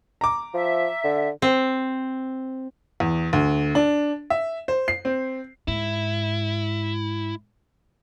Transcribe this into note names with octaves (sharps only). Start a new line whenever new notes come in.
A#5 D6
F3 E5
D3
C4
E2
D2
D4
E5
C5
C7
C4
G#2 E4